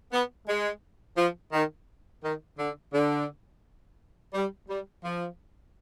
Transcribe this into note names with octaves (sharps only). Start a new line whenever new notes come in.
B3
G#3
F3
D#3
D#3
D3
D3
G3
G3
F3